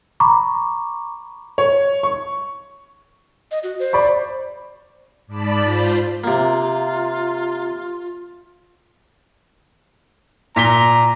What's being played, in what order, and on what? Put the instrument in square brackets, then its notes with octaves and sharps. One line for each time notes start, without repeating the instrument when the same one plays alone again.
[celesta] A#5 B5 C#6 D6
[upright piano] C#5
C#6
[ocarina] D#5
F#4
C5
[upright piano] D5 B5 C#6
[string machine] G#2 D5 A5 B5
F4 C5
[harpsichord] C3 A#3 [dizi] F4
[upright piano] A#2 B6 G7 [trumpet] A#5